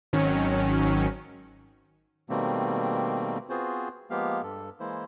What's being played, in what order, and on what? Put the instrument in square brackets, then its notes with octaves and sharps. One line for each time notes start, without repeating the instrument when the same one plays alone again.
[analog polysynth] G#1 D#3 F#3 C#4
[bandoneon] B2 D#3 G3 A3 A#3 C4
B3 C4 F4 F#4 G#4 C5
F3 G#3 A#3 B3 G4 F5
G2 A4
E3 G#3 A#3 E4 C5